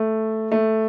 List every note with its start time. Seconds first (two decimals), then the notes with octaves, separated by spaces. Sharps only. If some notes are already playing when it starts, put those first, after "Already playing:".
Already playing: A3
0.52 A3